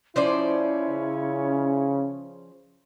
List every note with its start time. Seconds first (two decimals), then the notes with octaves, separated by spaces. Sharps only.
0.16 F3 C#4 E4 C5 D5
0.89 C#3